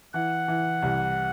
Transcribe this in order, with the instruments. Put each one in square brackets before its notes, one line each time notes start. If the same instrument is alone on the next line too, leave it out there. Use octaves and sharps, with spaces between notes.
[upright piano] E3 [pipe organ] F#5
[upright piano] E3
C2